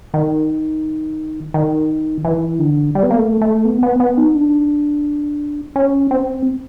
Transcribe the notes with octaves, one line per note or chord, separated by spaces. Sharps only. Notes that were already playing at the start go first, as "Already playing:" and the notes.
D#3
D#3
E3
D3
G3
B3
A#3
A3
A3
B3
B3
B3
D#4
D4
C#4
C4